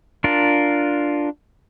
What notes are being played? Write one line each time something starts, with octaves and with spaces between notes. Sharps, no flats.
D4 F4 A#4